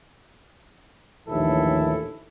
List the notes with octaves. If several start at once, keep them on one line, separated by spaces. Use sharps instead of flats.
A#1 D#2 A2 E3 E4 A4